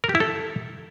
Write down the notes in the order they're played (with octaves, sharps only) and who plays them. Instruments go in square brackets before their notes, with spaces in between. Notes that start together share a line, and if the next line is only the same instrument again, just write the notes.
[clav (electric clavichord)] A#4
G4
E4
A4